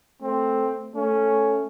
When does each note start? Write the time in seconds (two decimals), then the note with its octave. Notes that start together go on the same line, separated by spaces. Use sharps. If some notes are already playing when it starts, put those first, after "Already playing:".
0.22 A3 C4
0.95 A3 C#4